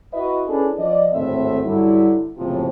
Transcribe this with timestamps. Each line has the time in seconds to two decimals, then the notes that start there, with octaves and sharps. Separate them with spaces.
0.13 E4 F#4 B4 D#5 E5
0.47 C#4 D4 E4 G#4 A4 B4
0.78 F3 D5 D#5
1.13 G#1 D2 A2 A3 C4 E5
1.64 G2 D3 F#3 E4
2.38 F#1 A2 C3 F3